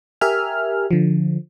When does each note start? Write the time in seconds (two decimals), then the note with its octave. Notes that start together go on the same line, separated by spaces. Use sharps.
0.21 G4 A#4 E5 G#5 F6
0.91 D3 F3